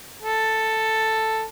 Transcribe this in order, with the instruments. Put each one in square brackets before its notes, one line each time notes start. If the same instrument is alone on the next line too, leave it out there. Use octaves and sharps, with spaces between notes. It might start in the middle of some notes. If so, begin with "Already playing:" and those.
[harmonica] A4